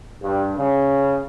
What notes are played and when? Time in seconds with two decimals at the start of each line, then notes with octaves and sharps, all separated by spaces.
0.22 G2
0.57 C#3